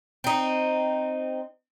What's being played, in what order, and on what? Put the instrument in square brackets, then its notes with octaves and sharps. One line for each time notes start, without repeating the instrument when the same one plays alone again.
[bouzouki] C4 D#4